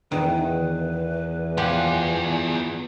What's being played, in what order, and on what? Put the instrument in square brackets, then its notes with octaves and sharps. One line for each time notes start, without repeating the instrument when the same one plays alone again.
[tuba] E2 [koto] D#3 [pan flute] B4
[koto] F3 G4 F#5 [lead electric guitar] B3 G#5